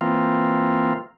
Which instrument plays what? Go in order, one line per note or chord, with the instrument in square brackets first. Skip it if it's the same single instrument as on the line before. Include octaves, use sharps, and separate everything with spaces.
[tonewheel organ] E3 A#3 C4 F4